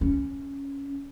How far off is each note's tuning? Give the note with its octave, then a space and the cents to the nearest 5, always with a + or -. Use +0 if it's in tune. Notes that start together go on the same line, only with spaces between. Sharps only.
C#4 +0